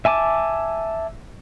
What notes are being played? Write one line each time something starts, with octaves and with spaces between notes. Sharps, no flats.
E5 G#5 A5 D6